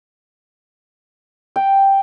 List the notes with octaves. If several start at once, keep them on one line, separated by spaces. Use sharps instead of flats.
G5